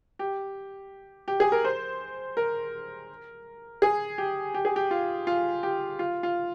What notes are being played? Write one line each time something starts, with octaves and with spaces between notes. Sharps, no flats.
G4
G4
G#4
A#4
C5
A#4
G#4
G4
G4
G#4
G4
F4
F4
G4
F4
F4